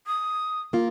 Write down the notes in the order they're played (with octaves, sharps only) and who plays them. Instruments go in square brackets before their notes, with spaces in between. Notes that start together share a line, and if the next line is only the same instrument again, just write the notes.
[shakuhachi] D#6
[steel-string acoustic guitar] A#3 F4